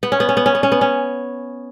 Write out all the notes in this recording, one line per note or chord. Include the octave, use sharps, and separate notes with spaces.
B3
C#4
B3
C#4
B3
C#4
B3
C#4
B3
C#4